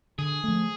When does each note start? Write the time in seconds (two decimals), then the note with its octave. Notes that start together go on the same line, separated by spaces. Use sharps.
0.18 D3 G#4
0.44 F3 A3